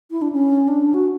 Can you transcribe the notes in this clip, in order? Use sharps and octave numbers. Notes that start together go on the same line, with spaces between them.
E4
D4
C#4
D4
F#4